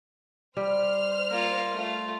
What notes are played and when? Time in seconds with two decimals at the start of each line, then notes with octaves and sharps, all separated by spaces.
0.57 G3 C5 F6
1.30 A#3 F4
1.72 A3 F4